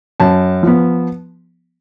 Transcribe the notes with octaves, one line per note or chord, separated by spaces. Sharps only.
F#2 A5
F3 B3